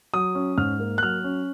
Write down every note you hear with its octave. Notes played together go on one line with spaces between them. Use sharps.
F#3 D#6
C#4
G#2 F6
A#3
F#6
F#3 F6
C#4